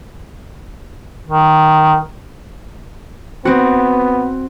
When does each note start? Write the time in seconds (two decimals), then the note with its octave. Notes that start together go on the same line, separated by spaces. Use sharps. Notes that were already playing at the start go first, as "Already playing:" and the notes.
1.25 D#3
3.45 B3 C4 F#4